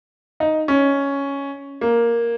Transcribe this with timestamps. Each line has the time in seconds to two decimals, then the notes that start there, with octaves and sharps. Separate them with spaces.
0.40 D#4
0.68 C#4
1.81 A#3